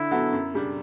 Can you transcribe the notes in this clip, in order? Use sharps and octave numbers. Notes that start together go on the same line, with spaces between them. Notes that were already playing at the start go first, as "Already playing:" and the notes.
Already playing: D3 E4
F#3 B3 F#4 A4
F#2
C#3 G3 D4